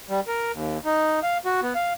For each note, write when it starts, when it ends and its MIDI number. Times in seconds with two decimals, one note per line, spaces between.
0.09 0.20 55
0.28 0.52 70
0.53 0.78 39
0.85 1.20 63
1.23 1.38 77
1.45 1.61 66
1.63 1.73 59
1.75 1.93 77